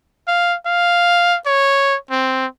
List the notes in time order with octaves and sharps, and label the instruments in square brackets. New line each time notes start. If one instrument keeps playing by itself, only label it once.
[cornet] F5
F5
C#5
C4